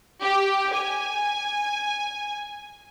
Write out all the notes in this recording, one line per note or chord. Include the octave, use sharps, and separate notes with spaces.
G4
G#5